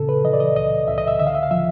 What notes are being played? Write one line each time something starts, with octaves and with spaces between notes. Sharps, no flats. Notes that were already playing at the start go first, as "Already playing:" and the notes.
Already playing: A#2 C#3 A4
B4
E3 D#5
D5
D#5
C#2 D#5
C#2 E5
D#5
E5
D3 E5
F5
E5
F5
F3 E5